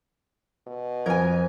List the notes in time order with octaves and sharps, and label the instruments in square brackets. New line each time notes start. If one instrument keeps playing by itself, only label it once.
[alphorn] B2
[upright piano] F2 [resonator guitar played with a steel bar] A#4 G#5 [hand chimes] C5 G#6